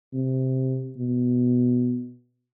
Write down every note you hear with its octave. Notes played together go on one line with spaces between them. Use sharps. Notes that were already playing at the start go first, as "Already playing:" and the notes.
C3
B2